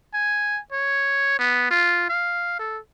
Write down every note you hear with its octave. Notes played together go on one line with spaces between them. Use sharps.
G#5
C#5
B3
F4
F5
A4